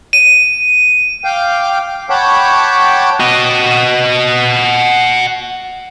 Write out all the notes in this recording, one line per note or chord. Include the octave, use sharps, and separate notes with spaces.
D#7
F5 G5 D6
C#5 F#5 G5 A5 B5 D6
F#4 D#5